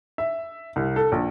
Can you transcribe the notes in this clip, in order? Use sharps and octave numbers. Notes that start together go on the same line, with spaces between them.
E5
C2
A4
A#1